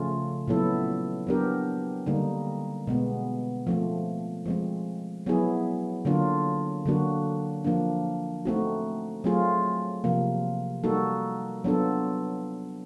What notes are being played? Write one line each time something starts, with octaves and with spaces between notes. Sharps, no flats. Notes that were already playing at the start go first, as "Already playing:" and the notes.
Already playing: C#3 F3 A3 C#4 F4
A#2 F#3 B3 E4 A4
F#3 B3 D4 G4 A#4
D3 G3 A#3 D#4
B2 G#3 B3
F3 A3 C4
F3 G#3 C4
F#3 B3 E4 G#4
D3 F#3 A#3 D4 F4
D3 F#3 A#3 D4 F#4
F3 A#3 D4
A3 C4 D#4 F#4
F#3 A3 C4 F4 G#4
C3 F3 A#3
G3 A#3 D#4 F#4 A4
F#3 B3 D4 F4 A4